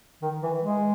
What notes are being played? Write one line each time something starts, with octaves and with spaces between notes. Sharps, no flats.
D#3
E3
G#3